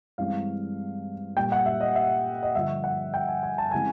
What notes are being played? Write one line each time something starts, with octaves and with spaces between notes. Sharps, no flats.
G2 E3 G#3 C4 F5
A#2 G3 A#3 G5
F#5
E5
D#5
E5
D#5
G2 D3 F3 E5
F#5
G5
G#5
G#5
A5
C#3 E3 G#3 C4 G#5